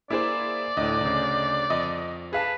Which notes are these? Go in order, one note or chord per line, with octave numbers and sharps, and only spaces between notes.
A#3 E4 G#4 C5 D5 D6
D2 A2 D#5
D2 C#3
F2 D#5
G#4 B4 F5 A5